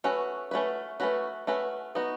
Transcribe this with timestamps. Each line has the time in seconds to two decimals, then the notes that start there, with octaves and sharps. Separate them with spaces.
0.04 A3 C#4 F#4 B4
0.51 A3 C#4 F#4 B4
1.00 A3 C#4 F#4 B4
1.47 A3 C#4 F#4 B4
1.95 B3 D#4 F#4